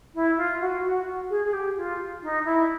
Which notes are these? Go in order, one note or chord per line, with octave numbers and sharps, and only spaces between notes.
E4
F4
F#4
F#4
G#4
G#4
G4
F4
D#4
E4